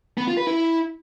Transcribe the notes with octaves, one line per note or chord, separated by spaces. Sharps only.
B3
F4
B4
E4